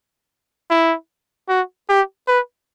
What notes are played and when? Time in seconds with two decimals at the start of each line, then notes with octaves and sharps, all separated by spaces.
0.70 E4
1.49 F#4
1.89 G4
2.28 B4